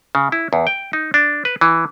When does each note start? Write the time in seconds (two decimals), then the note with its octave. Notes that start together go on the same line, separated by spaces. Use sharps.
0.15 C#3
0.32 E4
0.53 E2
0.67 G5
0.93 D#4
1.14 D4
1.45 B4
1.61 E3